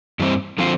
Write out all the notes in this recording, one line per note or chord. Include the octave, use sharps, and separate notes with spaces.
G2 E3 G3 C4
D3 F3 C4 F4